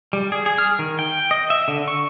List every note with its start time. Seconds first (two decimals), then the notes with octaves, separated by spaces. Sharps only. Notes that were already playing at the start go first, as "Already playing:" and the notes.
0.13 G3
0.32 G#4
0.46 G#4
0.58 F6
0.79 D#3
0.99 G5
1.31 D#5
1.50 E5
1.68 D3
1.88 C#6